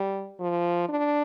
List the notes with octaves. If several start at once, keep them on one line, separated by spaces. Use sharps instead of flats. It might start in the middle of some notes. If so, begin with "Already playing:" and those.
Already playing: G3
F3
D4